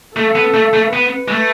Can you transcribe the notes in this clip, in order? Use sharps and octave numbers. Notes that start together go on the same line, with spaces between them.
A3 A4
B3
A3
A3
B3 B4
G#3
A3